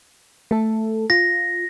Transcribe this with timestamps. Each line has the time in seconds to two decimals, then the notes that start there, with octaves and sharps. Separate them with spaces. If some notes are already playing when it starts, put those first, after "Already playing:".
0.51 A3 A4
1.10 F4 A#6